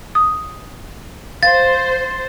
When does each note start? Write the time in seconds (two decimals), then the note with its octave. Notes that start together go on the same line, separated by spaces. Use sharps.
0.15 D#6
1.43 C5 F5 A6